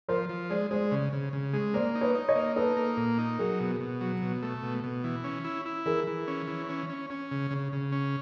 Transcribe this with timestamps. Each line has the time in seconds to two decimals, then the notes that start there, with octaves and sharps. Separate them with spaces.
0.08 F3 A#4 C5
0.29 F3
0.50 G#3 C5 D5
0.71 G#3 C5 D5
0.92 C#3
1.13 C#3
1.33 C#3
1.53 G#3
1.74 A#3 C5 D5
1.95 D#4
2.01 B4 C#5
2.15 D#4
2.29 C#5 D#5
2.35 A#3
2.56 D#4 A4 B4
2.77 A#3
2.97 A#2
3.18 D#4
3.39 F#3 G#4 A#4
3.60 B2
3.80 B2
4.01 F#3
4.22 B2
4.42 A3
4.63 B2
4.84 B2
5.04 E3
5.24 C#4
5.45 E4
5.65 E4
5.86 E3 G#4 A#4
6.07 E3
6.28 C#4
6.48 E3
6.69 C#4
6.90 C#4
7.10 C#4
7.31 C#3
7.51 C#3
7.73 C#3
7.92 C#4